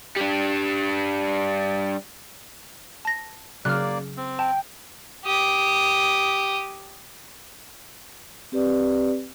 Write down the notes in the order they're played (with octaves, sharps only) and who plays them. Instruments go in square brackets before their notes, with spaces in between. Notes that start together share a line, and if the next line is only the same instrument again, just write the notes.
[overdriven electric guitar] G3 D4
[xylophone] A5 A#6
[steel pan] C#3 F#3 [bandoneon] A#3 D5 [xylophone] F6 F#6
[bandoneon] C4
[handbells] G5 [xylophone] A5
[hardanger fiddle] G4 D#6
[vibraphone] C4 G4 B4 D5